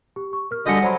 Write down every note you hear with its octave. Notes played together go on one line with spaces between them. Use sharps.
G4
C#6
A#4 F6
G2 D3 F#4 G4 D#5 G#5 A#5 C#7
F#3 C5 D5 B5 C6